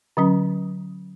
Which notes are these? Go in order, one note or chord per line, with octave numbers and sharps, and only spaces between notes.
D3 F#3 C#4